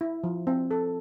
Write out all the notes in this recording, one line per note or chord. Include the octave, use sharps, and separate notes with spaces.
E4
F3
C4
A4